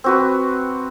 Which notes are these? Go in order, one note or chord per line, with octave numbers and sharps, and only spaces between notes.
C4 F#4 B4